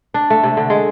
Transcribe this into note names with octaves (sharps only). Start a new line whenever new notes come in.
D4
A3
C3
D3
G#3